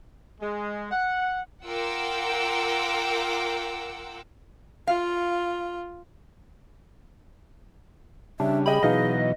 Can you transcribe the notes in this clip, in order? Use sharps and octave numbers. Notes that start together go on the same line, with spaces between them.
G#3
F#5
F4 A#4 F#5 G5 D6 E6
F4 F5
C#3 G3 D4 E5
G#4 D#5 G5 B5
B2 E3 F#3 D#4 B4 D#5 F5